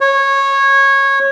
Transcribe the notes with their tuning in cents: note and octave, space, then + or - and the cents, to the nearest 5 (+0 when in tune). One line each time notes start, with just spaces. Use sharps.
C#5 -15